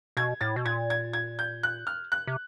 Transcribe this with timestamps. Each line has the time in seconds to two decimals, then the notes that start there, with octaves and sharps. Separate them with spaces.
0.17 B2 G#6
0.41 A2 A6
0.56 B2
0.65 A#2 G#6
0.90 G#6
1.13 G#6
1.39 G6
1.63 F#6
1.87 F6
2.12 F#6
2.27 C3